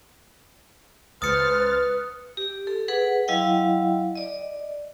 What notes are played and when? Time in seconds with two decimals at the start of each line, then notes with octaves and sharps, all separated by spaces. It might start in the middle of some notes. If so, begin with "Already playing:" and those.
1.22 C#2 B4 C5 D#6 F6 A6 C#7
2.37 G4
2.67 A4
2.88 G#4 B4 F#5
3.28 F#3 E4 D#5 F5 G5
4.15 D5 D#5